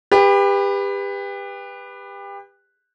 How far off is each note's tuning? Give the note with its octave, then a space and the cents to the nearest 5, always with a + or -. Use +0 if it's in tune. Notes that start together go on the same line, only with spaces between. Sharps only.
G4 +30 B4 +0